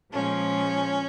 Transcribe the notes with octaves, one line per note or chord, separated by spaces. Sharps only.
A#2 F3 G#3 C#4